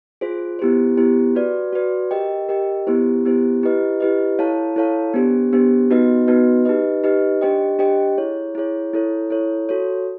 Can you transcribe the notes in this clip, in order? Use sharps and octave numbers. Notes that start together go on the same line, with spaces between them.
F4 G#4 C5
B3 E4 G4 C5
B3 E4 G4 C5
F#4 B4 D5
F#4 B4 D5
G4 A#4 D#5 G5
G4 A#4 D#5 G5
B3 E4 G4 C5
B3 E4 G4 C5
E4 G4 B4 D#5
E4 G4 B4 D#5
E4 A4 C#5 F5 A5
E4 A4 C#5 F5 A5
B3 D4 G4 C5
B3 D4 G4 C5
B3 D#4 F#4 B4 D#5
B3 D#4 F#4 B4 D#5
D#4 G4 B4 D#5
D#4 G4 B4 D#5
D4 G4 C5 D#5 G5
D4 G4 C5 D#5 G5
E4 G#4 C#5
E4 G#4 C#5
E4 A4 C#5
E4 A4 C#5
F#4 A4 C#5